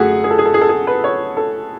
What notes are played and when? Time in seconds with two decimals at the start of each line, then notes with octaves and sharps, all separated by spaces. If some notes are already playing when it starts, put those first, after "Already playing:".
Already playing: F#2 D3 A3 F#4 G#4
0.24 G#4
0.31 A4
0.39 G#4
0.46 A4
0.54 G#4
0.61 A4
0.69 G#4
0.87 B4
1.04 C#5
1.37 A4